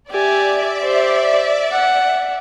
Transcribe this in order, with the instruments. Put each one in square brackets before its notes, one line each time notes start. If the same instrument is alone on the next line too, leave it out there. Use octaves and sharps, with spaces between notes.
[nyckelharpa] G4 G#5 [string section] D5 E5
[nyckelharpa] G4 C5
F#5